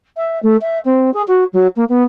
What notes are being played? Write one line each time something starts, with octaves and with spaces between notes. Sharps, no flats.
E5
A3
E5
C4
G#4
F#4
F#3
A#3
B3